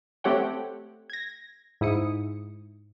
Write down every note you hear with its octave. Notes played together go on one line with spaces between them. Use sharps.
A3 C4 G4 C#5 F#5 G5
G#6 A#6
G#2 E4 D#6 C#7